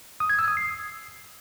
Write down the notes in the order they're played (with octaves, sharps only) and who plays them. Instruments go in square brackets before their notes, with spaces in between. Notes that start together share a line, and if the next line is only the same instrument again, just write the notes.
[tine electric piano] D#6
G#6
E6
D#6
C7